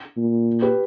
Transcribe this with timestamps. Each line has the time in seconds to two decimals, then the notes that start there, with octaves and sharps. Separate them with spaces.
0.17 A#2
0.62 G4 B4